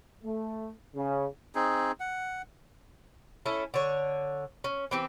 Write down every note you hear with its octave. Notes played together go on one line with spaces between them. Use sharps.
A3
C#3
C4 D#4 G#4
F#5
C#4 E4 A4
D3 C#5
C#4
E3 C4 G4